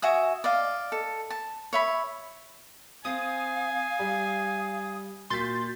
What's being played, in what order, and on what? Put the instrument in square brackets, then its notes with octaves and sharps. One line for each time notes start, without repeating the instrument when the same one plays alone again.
[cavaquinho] F#4 E5 G#5 D#6
D5 D#5 F5
A4
A5
C#5 E5 B5
[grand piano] C4 [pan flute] F5 [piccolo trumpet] G#5 [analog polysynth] D#6
[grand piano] G3
[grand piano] A#2 B6 [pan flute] F#4 [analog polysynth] C6 G6 A6